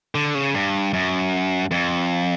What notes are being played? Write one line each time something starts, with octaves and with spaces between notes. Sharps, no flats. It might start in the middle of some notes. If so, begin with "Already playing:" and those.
D3
C#3
G2
F#2
F2